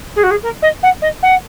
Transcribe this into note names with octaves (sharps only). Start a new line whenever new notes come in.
G#4
F#4
G#4
A#4
D#5
F#5
D#5
F#5